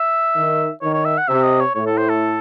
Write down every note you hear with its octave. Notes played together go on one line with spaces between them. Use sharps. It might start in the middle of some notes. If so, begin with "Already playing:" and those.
Already playing: E5
D#3
D#3 C#5
C#5
E5
F#5
C3 E5
D#5
C#5
A2 C#5
A4
C5
A4